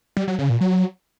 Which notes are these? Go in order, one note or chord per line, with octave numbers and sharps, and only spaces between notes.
G3
F#3
C#3
A#2
F#3